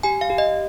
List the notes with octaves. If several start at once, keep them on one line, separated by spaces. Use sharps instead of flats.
G4 G#5
F5
G4
D#5